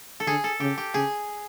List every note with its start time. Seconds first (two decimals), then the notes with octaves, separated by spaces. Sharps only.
0.20 A4
0.26 D3 G#4
0.44 A4
0.60 C#3 G4
0.77 G4
0.94 C#3 G#4